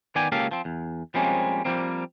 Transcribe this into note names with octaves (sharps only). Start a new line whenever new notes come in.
D#3 B3 D5 G5 G#5
C#2 A#3 C#4 G4 A4 F5
F3 C4
E2
F3 G3 G#3 A#3 C4 C#4
F3 G3 A#3 C4